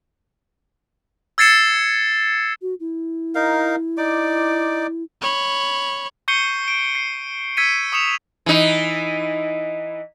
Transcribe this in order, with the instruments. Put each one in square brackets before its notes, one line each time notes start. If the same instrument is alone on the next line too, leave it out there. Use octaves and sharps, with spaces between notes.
[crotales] E6 G#6 A6 C7 C#7 E7
[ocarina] F#4
E4
[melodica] D#4 A#4 F5
D#4 D5 D6
[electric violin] C#5 B5
[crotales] C#6 G6 C7 C#7 D#7 G7
D7
C7
E6 G#6 B6 C#7 D#7
C#6 D#6 C#7 E7 F7
[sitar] E3 D#4